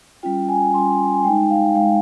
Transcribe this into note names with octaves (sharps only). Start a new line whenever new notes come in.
G3 C#4 F4 G5
G#5
G3 C#4 F4 C6
G#5
G#3 D#4 G5
F5
G#3 D#4 F5